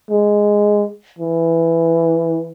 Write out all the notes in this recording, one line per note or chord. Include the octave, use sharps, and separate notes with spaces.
G#3
E3